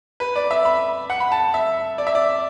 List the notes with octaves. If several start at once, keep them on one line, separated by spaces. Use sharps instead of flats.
B4
D5
E5
B5
F#5
B5
A5
E5
D5
E5
D5